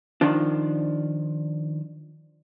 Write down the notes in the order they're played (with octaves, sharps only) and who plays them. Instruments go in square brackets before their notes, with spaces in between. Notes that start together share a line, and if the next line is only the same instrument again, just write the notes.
[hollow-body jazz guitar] D#3 F3 D4